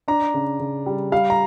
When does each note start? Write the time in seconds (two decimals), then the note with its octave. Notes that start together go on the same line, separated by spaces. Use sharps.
0.08 D4 A#5
0.34 C#3
0.60 C#3
0.86 G3
1.12 G3 F5
1.30 A#5